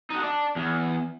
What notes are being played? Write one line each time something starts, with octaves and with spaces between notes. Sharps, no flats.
D#4 F#4
D4
E2